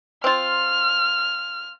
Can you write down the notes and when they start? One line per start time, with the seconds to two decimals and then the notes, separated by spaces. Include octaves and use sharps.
0.24 C4 F4 F6